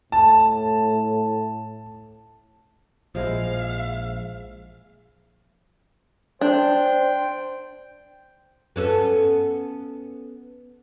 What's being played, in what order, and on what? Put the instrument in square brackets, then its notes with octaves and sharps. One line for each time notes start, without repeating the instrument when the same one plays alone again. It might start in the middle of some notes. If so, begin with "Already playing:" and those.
[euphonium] A2 [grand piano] A5
[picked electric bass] A#1 [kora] F3 G#3 E4 [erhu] F5
[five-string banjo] D4 [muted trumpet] C5 [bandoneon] G5
[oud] B3 C#4 A4